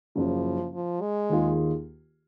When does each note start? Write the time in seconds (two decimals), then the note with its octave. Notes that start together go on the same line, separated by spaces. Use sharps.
0.15 F#1 F#2 C#3 F3
0.73 F3
1.01 G#3
1.30 D#2 D#3 A#3 F4 G#4